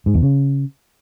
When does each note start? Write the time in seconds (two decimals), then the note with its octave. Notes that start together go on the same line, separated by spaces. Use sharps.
0.06 G#2
0.14 E2
0.22 C#3